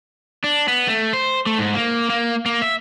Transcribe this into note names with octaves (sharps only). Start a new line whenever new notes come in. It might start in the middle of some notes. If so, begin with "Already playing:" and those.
D4
B3
A3
C5
A3
G#2
A#3
A#3
A#3
E5